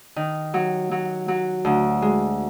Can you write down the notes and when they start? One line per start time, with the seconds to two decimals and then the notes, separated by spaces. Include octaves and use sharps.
0.16 D#3
0.54 F#3
0.91 F#3
1.28 F#3
1.65 D2
2.02 G#3